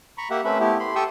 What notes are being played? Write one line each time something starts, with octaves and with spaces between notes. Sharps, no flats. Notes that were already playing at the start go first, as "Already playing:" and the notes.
A#5 B5 C#6
A#3 G4 E5 F#5
A3 C4 C#4 B4 E5 B5
A3 B3 E4 G4
B5 C6
G4 A4 G5 C#6 D#6 E6